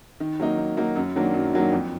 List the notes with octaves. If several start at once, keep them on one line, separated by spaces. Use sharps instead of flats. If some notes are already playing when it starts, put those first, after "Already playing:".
D#3
F#3 A#3 D#4
D#3
F#3 A#3 D#4
F#2
D#3 F#3 A#3 D4
F#2
D#3 F#3 A#3 D4
F2